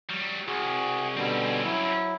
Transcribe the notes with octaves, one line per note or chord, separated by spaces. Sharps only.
F#3 G3
C2 F#4 G#4
B2 D3 G3 C4 C#4
F#3 E4